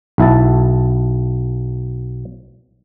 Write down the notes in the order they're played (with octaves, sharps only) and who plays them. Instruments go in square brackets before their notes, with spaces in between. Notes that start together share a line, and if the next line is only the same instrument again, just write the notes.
[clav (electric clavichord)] B1 E4 A5